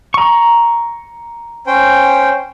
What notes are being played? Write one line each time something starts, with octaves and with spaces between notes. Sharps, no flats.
A#5 C#6
C#4 C5 G5